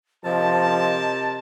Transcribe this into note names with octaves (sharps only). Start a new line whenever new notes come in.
C3 F3 A#4 D#5 A5